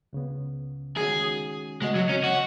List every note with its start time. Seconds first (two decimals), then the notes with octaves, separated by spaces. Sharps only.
0.13 C#2 C#3 B3
0.97 D#3 G#3 C#4 F#4 G#4
1.82 C#3 G#3 B3 F#4 D#5
1.96 F#3
2.09 C#4
2.24 F#4